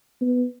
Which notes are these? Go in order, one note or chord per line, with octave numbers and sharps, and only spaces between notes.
B3